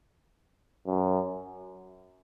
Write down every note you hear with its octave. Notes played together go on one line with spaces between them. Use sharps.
F#2